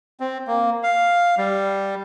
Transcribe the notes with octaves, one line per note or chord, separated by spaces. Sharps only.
C4
A#3
F5
G3